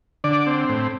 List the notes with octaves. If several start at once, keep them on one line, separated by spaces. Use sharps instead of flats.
D3 D5
C4
A2